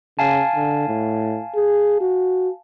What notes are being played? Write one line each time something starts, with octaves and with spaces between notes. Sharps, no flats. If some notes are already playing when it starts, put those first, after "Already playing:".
C#3 F5 G#5 A5
D3
A2
G#4
F#4